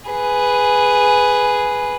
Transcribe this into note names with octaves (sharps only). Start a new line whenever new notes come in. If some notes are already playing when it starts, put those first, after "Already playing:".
G#4 B4